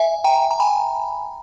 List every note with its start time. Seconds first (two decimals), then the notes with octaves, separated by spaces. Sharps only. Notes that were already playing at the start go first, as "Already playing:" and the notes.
Already playing: E5 G#5
0.24 G5 A#5
0.51 A#5
0.60 G#5 B5